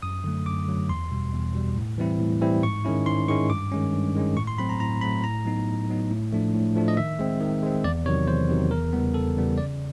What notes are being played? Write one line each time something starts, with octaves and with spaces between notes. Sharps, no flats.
F#2 D#6
D3 F#3 A3
F#2 D6
D3 F#3 A3
E2 C6
B2 G3
E2
B2 G3
A2
E3 G3 C4 E4
A2
E3 G3 C4 E4
G#2 C#6
D#3 G#3 C#4 E4
G#2 C6
D#3 G#3 C#4 E4 C#6
G2 D6
D#3 G#3 C#4
G2
D#3 G#3 C#4
A2 C#6
C6
F#3 A3 C4 B5
A#5
A2 A#5
F#3 A3 C4 B5
A2 A#5
F#3 B3 D#4
A2
F#3 B3 D#4
A2
F3 A3 D4
A2
F3 A3 D4
D#5
D#3 E5
G#3 C4
D#3
G#3 C4
E2 D5
C3 D#3 F#3 C#5
E2 C5
C3 D#3 F#3
E2 A#4
C#3 E3 G3 B3
E2 A4
C#3 E3 G3 B3
C#3 D5